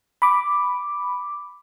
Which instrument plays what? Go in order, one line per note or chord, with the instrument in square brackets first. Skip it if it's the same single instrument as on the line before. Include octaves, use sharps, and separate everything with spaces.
[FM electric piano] B5 D6